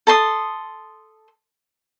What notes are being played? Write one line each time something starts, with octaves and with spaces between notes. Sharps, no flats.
A4 A#5 C6 D#6